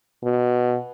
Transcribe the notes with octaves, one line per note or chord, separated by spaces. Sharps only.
B2